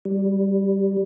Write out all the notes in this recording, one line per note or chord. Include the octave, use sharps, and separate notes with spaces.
G3